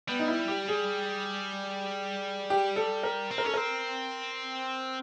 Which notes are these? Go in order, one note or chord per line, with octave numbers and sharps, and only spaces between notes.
G3 B3
D#4
E4
G4
G#4
G4
A4
A#4
C4
A#4
C#4 A4
C4 A#4